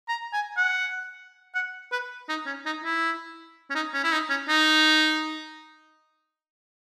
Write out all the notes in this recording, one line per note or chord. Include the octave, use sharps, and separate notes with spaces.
A#5
G#5
F#5
F#5
B4
D#4
C#4
D#4
E4
C#4
D#4
C#4
E4
D#4
C#4
D#4